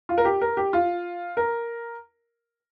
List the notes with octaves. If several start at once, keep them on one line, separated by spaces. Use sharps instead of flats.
F4
A#4
G4
A#4
G4
F4
A#4